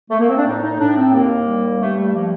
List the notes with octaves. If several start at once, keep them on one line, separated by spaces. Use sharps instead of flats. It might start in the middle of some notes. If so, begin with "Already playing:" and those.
A3
A#3
C4
D4
A2 D#4
D#4
A2 D4
C4
D#2 A#3
G3
G2 A3
A3
F3 A#3